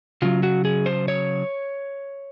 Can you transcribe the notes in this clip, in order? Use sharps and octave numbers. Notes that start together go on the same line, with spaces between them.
C#3 F#3 F4
F#4
G#4
C5
C#5